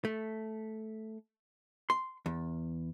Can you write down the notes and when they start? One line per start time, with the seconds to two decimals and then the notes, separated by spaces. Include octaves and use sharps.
0.05 A3
1.90 C6
2.26 E2